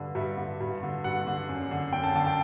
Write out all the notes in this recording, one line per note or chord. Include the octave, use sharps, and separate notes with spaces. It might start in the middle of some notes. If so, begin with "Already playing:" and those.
Already playing: G2 D3
G2 E5
D3
G2
D3
G2 F#5
D3
F#2
D3
F#2 G5
A5
D3 A5
G5